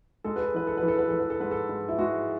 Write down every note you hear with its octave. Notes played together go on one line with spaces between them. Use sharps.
G#3 A4
B4
A4
E3 B4
A4
B4
E3
A4
B4
E3 A4
B4
A4
G#2 B4
A4
G#2
E4
G#3 F#4